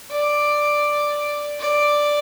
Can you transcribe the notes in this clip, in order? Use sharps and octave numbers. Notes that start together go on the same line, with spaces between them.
D5
D5